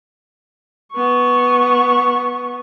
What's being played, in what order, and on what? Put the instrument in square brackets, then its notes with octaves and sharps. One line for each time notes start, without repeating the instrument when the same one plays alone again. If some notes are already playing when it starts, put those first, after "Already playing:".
[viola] B3 C#6